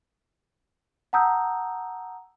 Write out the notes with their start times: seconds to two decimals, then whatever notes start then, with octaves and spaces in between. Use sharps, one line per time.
1.13 F#5 A5 A#5 D#6 E6 G6